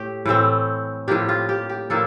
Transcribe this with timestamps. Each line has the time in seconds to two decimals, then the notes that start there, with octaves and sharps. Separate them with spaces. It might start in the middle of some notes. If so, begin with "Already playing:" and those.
Already playing: A2 A3 G4
0.26 A2 E3 A3 C4
1.08 A2 F3 A#3 D4 G4
1.29 F4
1.49 G4
1.69 G4
1.90 A2 F3 A#3 D4 A4